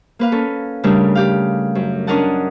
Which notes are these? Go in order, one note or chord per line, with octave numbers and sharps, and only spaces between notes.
A#3 B4 F5
C#4 A4
C#3 G3 A3 D4 A#4
G4 F5
F#2
C#4 D4 A#4 D#5 F#5 A5